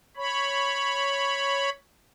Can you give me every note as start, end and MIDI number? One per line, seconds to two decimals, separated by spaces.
0.17 1.70 73
0.17 1.70 83